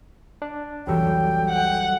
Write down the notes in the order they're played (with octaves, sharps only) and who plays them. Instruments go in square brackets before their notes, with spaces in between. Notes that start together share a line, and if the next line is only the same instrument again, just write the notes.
[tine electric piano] D4
[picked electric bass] C2 F2 E3 [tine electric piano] F#3 G3 A4 [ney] G5
[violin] F#5